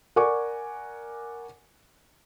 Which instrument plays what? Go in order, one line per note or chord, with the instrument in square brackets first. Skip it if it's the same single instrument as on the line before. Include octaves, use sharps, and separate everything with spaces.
[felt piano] A#4 D5 F#5 G#5 C#6 D6